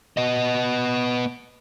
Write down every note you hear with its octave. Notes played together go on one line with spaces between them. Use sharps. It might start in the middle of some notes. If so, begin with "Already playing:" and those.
B3 D#5